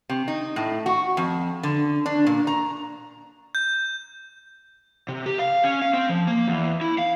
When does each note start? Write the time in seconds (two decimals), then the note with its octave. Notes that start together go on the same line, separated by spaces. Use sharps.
0.09 C3
0.28 D#4
0.56 A2
0.86 F#4
1.17 F2
1.63 D3
2.06 D4
2.27 A#2
2.47 A#5
3.55 G6
5.09 C3
5.26 G4
5.39 F5
5.64 C#4
5.82 F5
5.94 C4
6.09 F3
6.27 A#3
6.48 E2
6.81 E4
6.98 F5